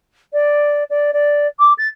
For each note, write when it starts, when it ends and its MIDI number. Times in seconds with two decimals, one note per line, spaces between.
0.32 0.83 74
0.89 1.11 74
1.13 1.47 74
1.59 1.73 86
1.78 1.88 93